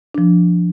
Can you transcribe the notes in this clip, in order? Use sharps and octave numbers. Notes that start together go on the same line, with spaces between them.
F3 D4